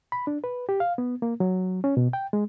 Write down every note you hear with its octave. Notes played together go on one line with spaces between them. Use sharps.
B5
D4
B4
G4
F5
B3
A#3
F#3
C#4
B2
G5
G#3